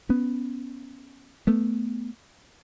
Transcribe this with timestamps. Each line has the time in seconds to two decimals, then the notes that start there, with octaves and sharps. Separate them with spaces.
0.09 B3 C#4
1.47 A3 B3